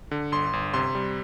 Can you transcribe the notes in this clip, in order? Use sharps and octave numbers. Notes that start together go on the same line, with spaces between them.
D3
G1 C6
G1
C3 C6
G3